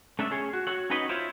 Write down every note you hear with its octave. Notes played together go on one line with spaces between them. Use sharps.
A3 C#4 D4 A4 E5
C#4 G#4 C#5
F#4
F#4 A4 C#5 F#5
C#4 D#4 F#4 B4 C#5 D#5
E4 F4 C5 C#5